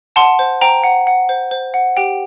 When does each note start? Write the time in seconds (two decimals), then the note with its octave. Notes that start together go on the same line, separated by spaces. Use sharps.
0.16 F#5 A5 C6
0.39 C5
0.61 C5 G5 A#5
0.84 F#5
1.07 F#5
1.29 C5
1.51 C5
1.74 F#5
1.97 G4 G5